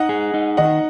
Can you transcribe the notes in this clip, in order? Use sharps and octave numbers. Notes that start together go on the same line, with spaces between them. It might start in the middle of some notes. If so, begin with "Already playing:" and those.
Already playing: D#4 D#5 F#5
G#4
D#4
D#3 D#5 F#5